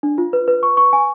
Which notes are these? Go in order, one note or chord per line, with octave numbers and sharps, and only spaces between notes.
D4
F4
B4
B4
C#6
C#6
G#5